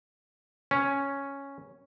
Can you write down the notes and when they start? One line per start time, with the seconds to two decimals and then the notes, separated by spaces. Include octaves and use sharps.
0.71 C#4